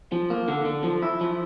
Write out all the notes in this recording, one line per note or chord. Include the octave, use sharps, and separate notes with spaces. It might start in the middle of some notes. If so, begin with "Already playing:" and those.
F3
A#3
D3
D3
F3
E4
F3